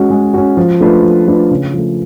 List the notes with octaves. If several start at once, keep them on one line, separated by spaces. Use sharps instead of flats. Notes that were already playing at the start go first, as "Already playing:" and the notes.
Already playing: G#3 C#4 F#4
G#3
C#4 F#4
F3
A3 D4 F4 B4
F3
A3 D4 F4 B4
C#3
F3 A3